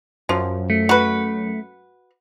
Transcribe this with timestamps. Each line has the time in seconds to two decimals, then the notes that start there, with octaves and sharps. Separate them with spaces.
0.29 F#2 F3
0.70 A3
0.89 F#4 B4